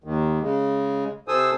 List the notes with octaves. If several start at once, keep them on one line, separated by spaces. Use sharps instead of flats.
D#2 D#3
C#3 G#3
C3 A4 C5 G#5 D#6 E6